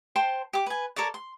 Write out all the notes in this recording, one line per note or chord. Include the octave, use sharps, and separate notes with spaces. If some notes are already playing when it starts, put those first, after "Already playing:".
C5 G5 A5 C6
G4 D6
B4 G#5
A4 A#4 C#5 D5
C6